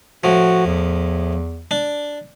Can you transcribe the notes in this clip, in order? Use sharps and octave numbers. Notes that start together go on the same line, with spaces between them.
A2 F3 F#4
E2
D4